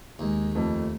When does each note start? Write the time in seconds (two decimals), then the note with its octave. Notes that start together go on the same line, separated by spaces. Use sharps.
0.19 D#2 G#3
0.55 F2 A3